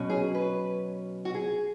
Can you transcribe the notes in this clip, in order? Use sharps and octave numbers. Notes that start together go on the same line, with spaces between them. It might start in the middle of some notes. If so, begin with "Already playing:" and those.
Already playing: B2 F#3 C#4
G#4
B4
F#4
G#4